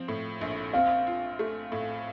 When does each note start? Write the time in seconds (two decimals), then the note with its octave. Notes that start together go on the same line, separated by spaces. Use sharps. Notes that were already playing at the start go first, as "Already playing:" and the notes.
Already playing: F3 C4
0.08 A2
0.41 A#1
0.73 C4 F5
1.07 F4
1.39 A3
1.72 A2